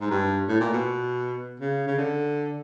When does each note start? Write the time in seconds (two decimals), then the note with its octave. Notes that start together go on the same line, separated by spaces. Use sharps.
0.01 G#2
0.11 G2
0.48 A2
0.60 A#2
0.73 B2
1.60 C#3
1.87 C#3
1.98 D3